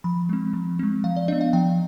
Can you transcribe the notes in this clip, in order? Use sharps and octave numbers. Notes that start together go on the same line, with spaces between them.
F3 B5
G#3 C4
F3
G#3 C4
F3 F5
D5
B3 D4 D#5
F5
F3 G5